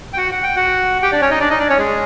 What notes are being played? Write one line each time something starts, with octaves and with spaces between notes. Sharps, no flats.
G5
F#4 F#5
F#5
G5
F#4 F#5
G4 G5
D4 D5
C#4 C#5
D#4 D#5
D4 D5
D#4 D#5
D4 D5
C#4 C#5
G#3 G#4